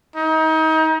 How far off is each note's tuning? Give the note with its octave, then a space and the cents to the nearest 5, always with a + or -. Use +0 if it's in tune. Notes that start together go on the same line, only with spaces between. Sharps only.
D#4 +30